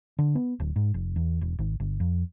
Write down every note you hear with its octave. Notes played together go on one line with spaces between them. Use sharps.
D3
B3
D1
G#2
F1
E2
E1
G#1
G1
F2